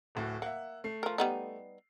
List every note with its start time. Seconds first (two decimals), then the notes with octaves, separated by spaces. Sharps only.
0.15 D1 A2 F#4
0.42 A#3 E5 F#5
0.84 A3 C7
1.03 F3 A#4
1.18 G3 B3 D#4